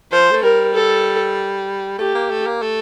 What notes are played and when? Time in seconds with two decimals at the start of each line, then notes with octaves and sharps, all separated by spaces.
0.12 F3 C5
0.31 A3
0.43 G3 A#4
0.74 A4
1.99 A3 G4
2.15 A#3
2.31 A3
2.46 A#3
2.62 A3